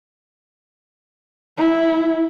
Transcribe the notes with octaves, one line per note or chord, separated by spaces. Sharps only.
E4